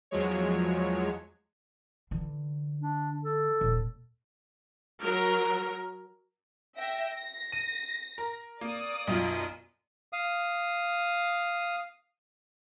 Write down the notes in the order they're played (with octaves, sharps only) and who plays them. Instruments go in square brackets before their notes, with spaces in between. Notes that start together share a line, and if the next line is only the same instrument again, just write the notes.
[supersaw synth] E2 F3 F#3 G#3 C#5
[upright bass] D3 E3
[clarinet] D4
A4
[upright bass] D#1
[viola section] F#3 A#4
[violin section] E5 G5 A#6
A#6
[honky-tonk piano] D#7
A#4
[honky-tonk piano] A#3 [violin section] D5 D#6
[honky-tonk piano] B1 F#2 F4
[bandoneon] F5 D#6